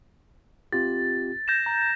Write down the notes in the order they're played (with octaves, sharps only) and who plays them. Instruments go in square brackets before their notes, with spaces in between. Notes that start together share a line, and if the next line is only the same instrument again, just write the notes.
[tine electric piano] C4 F4 G4 [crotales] A6
[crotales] G6 A#6 E7
[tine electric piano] A#5